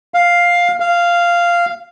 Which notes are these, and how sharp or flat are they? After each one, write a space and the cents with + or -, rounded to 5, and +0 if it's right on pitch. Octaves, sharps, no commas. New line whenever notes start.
F5 +5
F5 -10